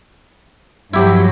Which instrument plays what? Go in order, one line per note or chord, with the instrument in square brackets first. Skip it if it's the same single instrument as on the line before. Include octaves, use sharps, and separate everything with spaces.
[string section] G2 F3 F#3 [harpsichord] E4 G4